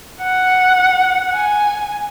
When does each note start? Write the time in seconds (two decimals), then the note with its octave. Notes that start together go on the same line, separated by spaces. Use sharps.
0.22 F#5
1.34 G#5